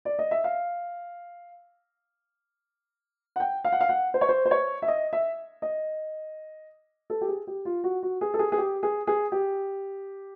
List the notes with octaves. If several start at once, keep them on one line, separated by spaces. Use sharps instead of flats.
D5
D#5
E5
F5
F#5
G5
F5
F#5
F5
F#5
C5
C#5
C5
C5
C#5
E5
D#5
E5
D#5
A4
G4
G#4
G4
F4
F#4
F#4
G#4
A4
G#4
G#4
G4
G#4
G#4
G4